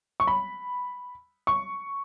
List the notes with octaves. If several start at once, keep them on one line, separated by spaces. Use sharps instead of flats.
C#6
B5
C#6